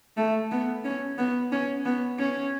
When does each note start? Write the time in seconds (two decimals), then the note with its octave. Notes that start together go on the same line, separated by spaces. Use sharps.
0.17 A3
0.52 B3
0.85 C#4
1.18 B3
1.52 C#4
1.86 B3
2.19 C#4